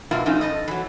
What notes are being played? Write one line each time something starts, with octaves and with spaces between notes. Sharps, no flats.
B2 F#3 A#3 E4 F4
F3 F#3 A3 C#4 D#4
B2 A4 D#5
E3 F#3